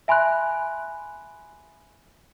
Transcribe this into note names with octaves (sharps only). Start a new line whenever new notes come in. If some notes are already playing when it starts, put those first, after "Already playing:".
E5 G#5 B5 C6 F#6